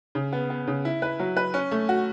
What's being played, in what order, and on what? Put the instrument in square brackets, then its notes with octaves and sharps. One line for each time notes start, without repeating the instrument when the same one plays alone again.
[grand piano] C#3
B3
B3
C#3
E4
B4
F#3
B4
C#4
A3
F#4